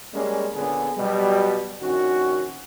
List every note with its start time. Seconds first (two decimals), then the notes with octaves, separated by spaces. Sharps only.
0.14 G3 G#3 A#3 C#4
0.55 A#2 D3 B3 C#4 G#4
0.96 B2 F#3 G3
1.81 A#1 D#3 C#4 F#4